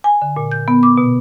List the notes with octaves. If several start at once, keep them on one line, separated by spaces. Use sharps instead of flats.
G#5
D3
A#2
G6
B3
D6
B2